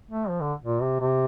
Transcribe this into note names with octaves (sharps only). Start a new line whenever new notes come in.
A3
F3
D3
A#2
C3
C3